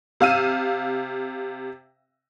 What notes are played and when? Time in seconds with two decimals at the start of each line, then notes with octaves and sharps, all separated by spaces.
0.20 C3 F5 E6 D#7